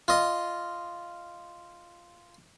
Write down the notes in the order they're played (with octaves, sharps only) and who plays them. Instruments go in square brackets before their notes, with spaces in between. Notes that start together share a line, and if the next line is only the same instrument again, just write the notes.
[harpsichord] F4 D#5